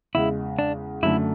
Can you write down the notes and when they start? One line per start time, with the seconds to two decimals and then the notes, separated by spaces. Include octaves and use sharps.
0.15 E2 C#3 G#3 E4
0.59 D4
1.03 F#2 D3 A3 E4